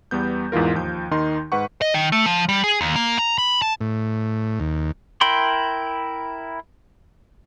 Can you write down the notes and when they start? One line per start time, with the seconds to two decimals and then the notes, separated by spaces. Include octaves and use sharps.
0.11 E2 G3 B3 G6
0.52 E2 G#2 E3 F4 A#4
0.75 D#2 F3 G6
1.11 D#2 D#3 D#4 C6
1.52 G#2 B4 F#5 C#6
1.81 D#5
1.94 D#3
2.12 A3
2.26 F3
2.49 G3
2.64 G#4
2.81 D#2
2.96 A#3
3.19 A#5
3.38 B5
3.62 A5
3.81 A2
4.60 D#2
5.21 E4 A#4 G5 B5 C6